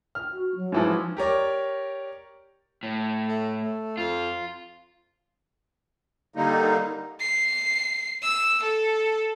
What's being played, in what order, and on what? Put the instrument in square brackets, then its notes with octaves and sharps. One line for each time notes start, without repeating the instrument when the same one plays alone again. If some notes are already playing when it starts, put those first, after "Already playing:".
[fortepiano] F6
[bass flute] F#4
F#3
[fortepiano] G#2 E3 F3
[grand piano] G4 A#4 C#5 D5
[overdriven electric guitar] A2
[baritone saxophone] A3
A3
[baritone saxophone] F2 [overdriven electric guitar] F4
[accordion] D3 G3 A#3 D#4
[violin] C7
E6
A4